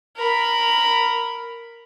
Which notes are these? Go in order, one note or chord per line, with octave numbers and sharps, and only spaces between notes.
A#4 B5